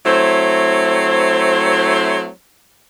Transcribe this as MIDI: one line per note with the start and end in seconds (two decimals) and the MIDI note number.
0.05 2.28 54
0.05 2.28 57
0.05 2.28 60
0.05 2.28 64
0.05 2.28 72